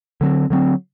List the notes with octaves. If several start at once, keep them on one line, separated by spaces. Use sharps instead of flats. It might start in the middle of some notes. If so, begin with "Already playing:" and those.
D3 F#3 A3 C4
D3 F#3 A3 C4